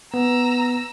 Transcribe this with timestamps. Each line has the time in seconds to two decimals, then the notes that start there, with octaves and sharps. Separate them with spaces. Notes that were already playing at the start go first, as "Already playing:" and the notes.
0.14 B3 A#5 E6